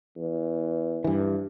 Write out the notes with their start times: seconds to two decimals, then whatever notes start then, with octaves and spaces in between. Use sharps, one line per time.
0.16 E2
1.04 G2 E3